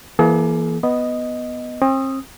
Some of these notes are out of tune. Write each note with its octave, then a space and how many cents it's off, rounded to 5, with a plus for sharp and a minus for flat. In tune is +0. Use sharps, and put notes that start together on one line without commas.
E3 +15 A#3 +25 G#4 +45
B3 +0 D#5 +0
C4 +40 D#6 +0